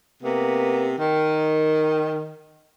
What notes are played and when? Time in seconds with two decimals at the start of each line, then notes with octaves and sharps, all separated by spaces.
0.23 C3 A#3 B3
0.99 D#3